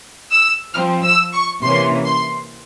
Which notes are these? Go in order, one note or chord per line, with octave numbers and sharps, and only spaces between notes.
E6
F3 C4 F6
E6
C#6
C3 E3 A#3 C#4 C6
C6